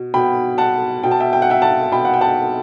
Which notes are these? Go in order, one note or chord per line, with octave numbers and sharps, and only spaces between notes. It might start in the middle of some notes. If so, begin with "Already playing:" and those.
Already playing: B2
B2 G5 B5
F#5 A5
B2 G5
A5
E5 G5
G5
F#5
E5 G5
F#5 A5
B2 G5 B5
F#5
G5
F#5 A5